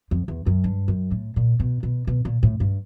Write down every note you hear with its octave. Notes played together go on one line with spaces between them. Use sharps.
F2
E2
F#2
G2
F#2
A2
A#2
B2
B2
B2
A#2
A2
G2